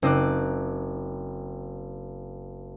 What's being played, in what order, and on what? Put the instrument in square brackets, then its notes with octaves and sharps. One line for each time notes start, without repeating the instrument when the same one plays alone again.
[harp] F#1 C4 D#4 D6 F#6